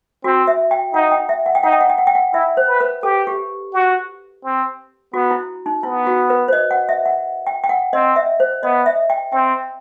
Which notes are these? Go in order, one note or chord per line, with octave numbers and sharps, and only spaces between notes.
C4 F#4
E5
G5
D#4 F#5
G5
E5
F#5
G5
D#4 F#5
G5
F#5
G5
F#5
G5
F#5
E4 E5
C5
B4
B4
G4 A4
G4
F#4
C4
B3 F#4
E4
D#4
B3 E4
F#4
B4
C5
D#5
F#5
E5
F#5
G5
G5
F#5
C4 D#5
E5
C5
B3 D#5
E5
G5
C4 G5